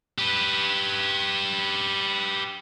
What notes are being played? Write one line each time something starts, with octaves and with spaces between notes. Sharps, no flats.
G4 B4